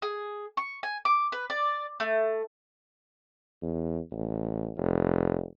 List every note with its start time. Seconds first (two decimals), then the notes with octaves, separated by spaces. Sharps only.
0.02 G#4
0.57 C#6
0.83 G#5
1.05 D6
1.32 B4
1.50 D5
2.00 A3
3.62 E2
4.12 A1
4.77 F1